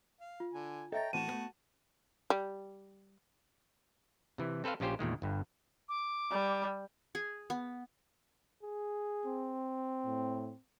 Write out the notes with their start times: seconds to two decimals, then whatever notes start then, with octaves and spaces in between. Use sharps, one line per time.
0.20 F5
0.40 F4
0.53 D3 G#5
0.92 A4 C#5 D#5 E5 G5 A#5 A6
1.13 A2 E3 C4 F#4 A5 D#7 E7
1.28 A3 B3
2.30 G3
4.38 C3 E3
4.64 C4 A4 B4 C5 F5
4.80 A#1 C#4 F4 G4 C5
4.99 E2 A#2 D#3 G#3
5.22 G1 G2
5.89 D6
6.31 G3
7.15 G#4
7.50 B3
8.63 G#4
9.26 C4
10.06 A2